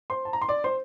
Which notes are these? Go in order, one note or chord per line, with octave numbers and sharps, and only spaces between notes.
C5 C6
A5
A#5
C6
D5 D6
C5 C6